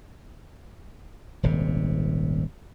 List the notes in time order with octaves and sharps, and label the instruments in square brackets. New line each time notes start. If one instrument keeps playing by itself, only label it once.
[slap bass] D#1 G#1 C3